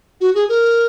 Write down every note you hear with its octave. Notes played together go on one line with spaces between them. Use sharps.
F#4
G#4
A#4